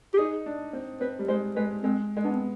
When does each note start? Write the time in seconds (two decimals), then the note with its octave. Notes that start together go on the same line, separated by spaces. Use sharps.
0.14 G4
0.18 D#4 G#4
0.46 D4
0.73 C4
1.01 C4 B4
1.19 G3
1.28 G#3 C5
1.56 G#3 B4
1.83 G#3 C4
2.17 G#3
2.24 B3 D4
2.33 C4